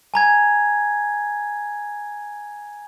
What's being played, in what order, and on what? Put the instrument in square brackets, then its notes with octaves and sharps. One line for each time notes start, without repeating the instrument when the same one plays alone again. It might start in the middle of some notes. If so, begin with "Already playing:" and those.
[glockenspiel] G#5 A#5 G#6